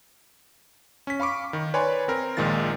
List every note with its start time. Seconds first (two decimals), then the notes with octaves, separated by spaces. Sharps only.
1.07 C#4 B6
1.20 F5 B5 C#6 D6
1.53 D#3
1.74 B4 C#5 D5 G#5 B5 C6
2.08 C4 A#4
2.37 A#1 A#2 D#3 G#3 F4 A6